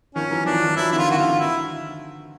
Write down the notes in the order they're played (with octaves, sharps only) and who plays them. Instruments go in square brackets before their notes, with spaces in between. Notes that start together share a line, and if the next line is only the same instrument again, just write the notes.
[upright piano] D#3 F3 [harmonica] C#4
[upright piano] E3 F#3
[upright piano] D#3 F3 [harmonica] D4
[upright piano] D#3 F3
[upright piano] E3 F#3 [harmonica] E4
[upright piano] D3 E3 [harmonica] E4
[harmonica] F4
[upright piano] D#3
[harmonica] F#4
F4
[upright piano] D3
[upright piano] D#3 [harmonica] E4